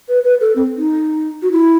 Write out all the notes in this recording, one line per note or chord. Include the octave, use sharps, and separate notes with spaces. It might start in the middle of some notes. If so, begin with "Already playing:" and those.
B4
B4
A4
C4
D#4
F#4
E4